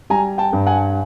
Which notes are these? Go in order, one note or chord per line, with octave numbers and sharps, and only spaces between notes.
G3 G#5 A#5
G5 A5
G2
F#5 G#5